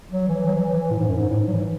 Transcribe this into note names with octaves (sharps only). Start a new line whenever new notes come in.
F#3
E3
F#3
E3
E3
A2
G#2
F#2
G#2
A2
G#2
F#3
E3